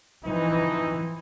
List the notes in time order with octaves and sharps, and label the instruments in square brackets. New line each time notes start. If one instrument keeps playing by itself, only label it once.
[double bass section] E3 [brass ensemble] F3 C4 D#4